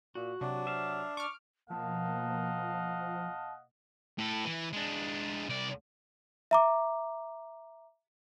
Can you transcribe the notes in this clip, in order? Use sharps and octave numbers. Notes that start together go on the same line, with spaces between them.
A#2 F#4
C3 F#3 D4
E5 F5
C#6 D6 F6
B2 F3 A#3 D#5 F5 F#5 A5
A2 A4
E3
G#3 D4
C2 D5
E5 A#5 D6